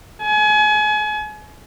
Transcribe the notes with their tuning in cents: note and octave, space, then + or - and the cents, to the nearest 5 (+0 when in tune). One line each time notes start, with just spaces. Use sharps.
G#5 +35